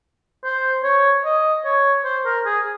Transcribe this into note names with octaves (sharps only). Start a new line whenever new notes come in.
C5
C#5
D#5
C#5
C5
A#4
G#4